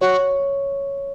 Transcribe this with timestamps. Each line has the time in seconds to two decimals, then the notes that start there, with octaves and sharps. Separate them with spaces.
0.01 F#4 C#5